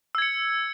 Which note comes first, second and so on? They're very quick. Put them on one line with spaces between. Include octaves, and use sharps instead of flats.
E6 G#6 C#7